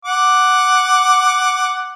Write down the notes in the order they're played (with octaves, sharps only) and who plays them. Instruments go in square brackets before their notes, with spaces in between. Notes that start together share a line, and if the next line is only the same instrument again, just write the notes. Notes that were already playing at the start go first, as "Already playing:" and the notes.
[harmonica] F#5 D6